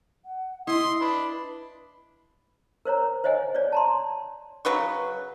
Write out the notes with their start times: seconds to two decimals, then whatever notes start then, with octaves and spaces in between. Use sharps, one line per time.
0.25 F#5
0.67 E4 D#5 C6 D#6
1.01 D4 B4 B5
2.85 A#4 C5 C#5 A#5
3.24 C5 C#5 D#5 F#5 G#5
3.55 C#5 D5
3.72 A5 A#5 C6
4.65 C#3 F#3 B4 C#6